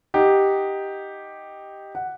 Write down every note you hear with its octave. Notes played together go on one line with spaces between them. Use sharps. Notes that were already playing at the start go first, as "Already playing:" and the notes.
D#4 G4 F#5
F#5